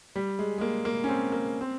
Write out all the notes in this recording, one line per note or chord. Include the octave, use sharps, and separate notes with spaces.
G3
G#3
G#3
A#3
A#3
C#4
C4
A#3
C4